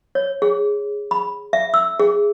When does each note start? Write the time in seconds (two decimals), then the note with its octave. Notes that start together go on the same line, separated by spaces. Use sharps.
0.15 C#5
0.42 G#4
1.11 B5
1.53 E5
1.74 E6
2.00 G#4